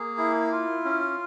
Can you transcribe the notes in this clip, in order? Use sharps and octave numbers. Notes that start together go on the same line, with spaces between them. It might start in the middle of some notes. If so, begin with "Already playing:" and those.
Already playing: A#3 G#4
E4
F4
C#4